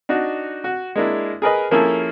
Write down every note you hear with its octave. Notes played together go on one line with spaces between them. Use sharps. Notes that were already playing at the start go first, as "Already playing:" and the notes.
D4 D#4 F#4
F#4
G#3 A#3 D4 E4
G#4 A#4 B4 D#5
F3 A#3 C#4 E4 G#4 A4